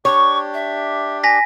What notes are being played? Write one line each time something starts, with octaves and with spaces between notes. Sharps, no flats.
D4 G4 C#5 C#6
E5
G#5 A#6 B6